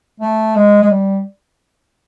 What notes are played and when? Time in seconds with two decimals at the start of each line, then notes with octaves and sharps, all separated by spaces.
0.20 A3
0.55 G#3
0.82 G#3
0.91 G3